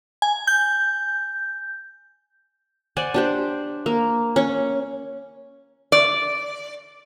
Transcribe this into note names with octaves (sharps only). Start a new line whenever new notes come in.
G#5
G6
C5 D5 F#5 G#5
D4 G4 C5
A#3
C#4 C#6
D5